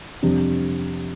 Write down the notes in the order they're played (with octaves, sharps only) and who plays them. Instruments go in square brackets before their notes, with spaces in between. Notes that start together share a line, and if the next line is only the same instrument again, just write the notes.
[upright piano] F2 C3 G3 D4